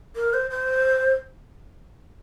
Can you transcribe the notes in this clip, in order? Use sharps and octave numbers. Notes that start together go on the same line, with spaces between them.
A#4
C5
C5